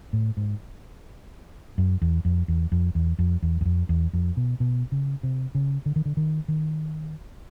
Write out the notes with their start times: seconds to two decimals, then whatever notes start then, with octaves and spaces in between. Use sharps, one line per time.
0.13 A2
0.37 G#2
1.78 F#2
2.02 E2
2.25 F2
2.48 E2
2.72 F2
2.95 E2
3.19 F2
3.42 E2
3.61 E2
3.65 F2
3.89 E2
4.13 F2
4.37 B2
4.60 B2
4.92 C#3
5.23 C3
5.55 C#3
5.86 D3
5.96 D#3
6.05 D3
6.17 D#3
6.48 D#3